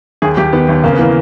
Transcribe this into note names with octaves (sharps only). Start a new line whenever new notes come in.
D#2 G#4
D#2 G4
D#3 B3
D#2
C#3 A#3
B3
E3 A#3